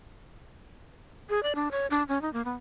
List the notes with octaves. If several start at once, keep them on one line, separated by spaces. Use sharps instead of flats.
G#4
D5
D4
C#5
D4
C#4
D#4
A#3
B3